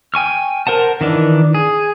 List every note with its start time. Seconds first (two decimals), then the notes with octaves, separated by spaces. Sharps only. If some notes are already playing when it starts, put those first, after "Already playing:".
0.14 G5 G#5 C#6 F6
0.67 A#4 C5 F#5 A5
1.01 D#3 E3 D4
1.54 G#4